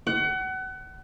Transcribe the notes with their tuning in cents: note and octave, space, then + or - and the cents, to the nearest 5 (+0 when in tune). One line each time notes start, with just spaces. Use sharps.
F#5 +30